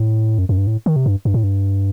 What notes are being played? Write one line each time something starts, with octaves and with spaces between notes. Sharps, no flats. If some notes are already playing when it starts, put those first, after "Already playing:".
Already playing: A2
F#2
F#2
G2
A2
D#3
C3
G2
G2
A2
G2